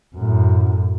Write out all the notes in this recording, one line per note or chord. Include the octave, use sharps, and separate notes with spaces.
F#2 A2